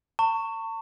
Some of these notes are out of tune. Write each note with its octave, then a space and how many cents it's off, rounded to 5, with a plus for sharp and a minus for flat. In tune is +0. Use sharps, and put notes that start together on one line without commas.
A5 +45 C#6 +0